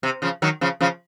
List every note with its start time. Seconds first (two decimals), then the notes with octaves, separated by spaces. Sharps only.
0.03 C3
0.22 C#3 F3
0.42 D#3 F#3
0.61 C#3 F3
0.81 C#3 F3